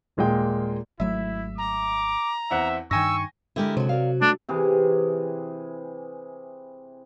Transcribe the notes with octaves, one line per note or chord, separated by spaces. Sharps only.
D#1 A#2 G#3 A#3 G5
G#1 F#3 A3 E4 E5
A#5 D6
E2 C4 E5 F#5
G2 D#3 G5 G#5 C#6 E6 A#6
D3 G#3 E4 G4 A#4
C3 F#3 F#4
A#4 D5 F5
A3 D4
C3 E3 G#4